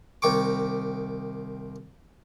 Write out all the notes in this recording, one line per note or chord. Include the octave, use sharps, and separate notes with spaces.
C2 D#3 G5 C#6 D6